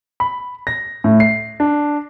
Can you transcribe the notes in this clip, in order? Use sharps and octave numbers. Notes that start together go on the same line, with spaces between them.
B5
A#6
A2
C7
D4